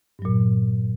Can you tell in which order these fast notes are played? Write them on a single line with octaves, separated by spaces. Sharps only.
G2 F#3 A#2